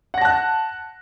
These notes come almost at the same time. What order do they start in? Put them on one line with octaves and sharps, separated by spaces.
F#5 A#6 A5 F#6